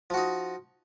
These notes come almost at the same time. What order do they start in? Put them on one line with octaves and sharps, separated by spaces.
F3 F#4 D#4